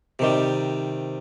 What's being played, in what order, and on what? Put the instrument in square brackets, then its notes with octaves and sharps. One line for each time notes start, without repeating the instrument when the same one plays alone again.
[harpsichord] C3 D#3 G3